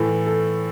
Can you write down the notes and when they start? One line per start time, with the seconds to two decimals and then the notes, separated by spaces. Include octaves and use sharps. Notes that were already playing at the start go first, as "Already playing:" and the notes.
Already playing: A2 E3 A4
0.27 A4